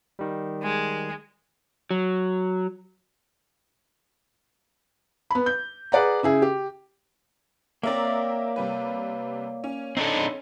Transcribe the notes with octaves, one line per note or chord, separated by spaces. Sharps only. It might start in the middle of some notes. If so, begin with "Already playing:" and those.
D#3 G3
G#3
F#3
B3 B5
G6
G#4 B4 D5 F#5 A#5
C#3 E4 G#4
G4
A#3 C4 A#4 C#5 D5 E5
C3 G3 B4
C#4
C4 D4 D#4 A4